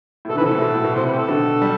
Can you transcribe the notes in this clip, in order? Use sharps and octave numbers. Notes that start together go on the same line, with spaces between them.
A2
B2 A4
D3
C3 E3 B4
A4
A2
B2
A2
B2
A2 C3 C5
B4
G4
A4
B2 D3
G3